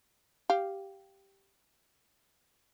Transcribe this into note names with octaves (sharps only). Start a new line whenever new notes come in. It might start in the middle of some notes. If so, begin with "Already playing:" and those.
G4 F5